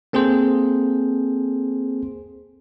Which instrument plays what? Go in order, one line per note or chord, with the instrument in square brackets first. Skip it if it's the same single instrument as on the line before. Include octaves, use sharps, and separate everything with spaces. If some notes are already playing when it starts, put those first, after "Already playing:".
[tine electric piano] A#3 C4 G#4 A4 C5